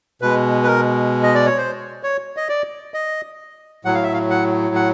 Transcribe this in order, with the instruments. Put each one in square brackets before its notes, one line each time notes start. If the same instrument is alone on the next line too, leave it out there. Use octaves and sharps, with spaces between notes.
[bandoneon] B2 G#3 B4
B4
A#4
D#5
D5
C#5
C5
C#5
D#5
D5
D#5
A2 F#3 F#5
F5
E5
F5
F#5
F#5